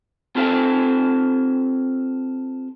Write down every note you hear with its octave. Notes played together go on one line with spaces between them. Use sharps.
C4 F4 G4 A4 C5 F5